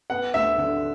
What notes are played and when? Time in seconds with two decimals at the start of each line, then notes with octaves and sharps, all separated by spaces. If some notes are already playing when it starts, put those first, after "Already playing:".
0.10 B3 F#5
0.34 D2 E5
0.58 D3